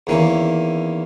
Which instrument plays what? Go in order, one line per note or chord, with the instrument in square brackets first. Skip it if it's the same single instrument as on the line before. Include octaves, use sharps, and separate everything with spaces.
[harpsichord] E2 D#3 A#3 C#4 E4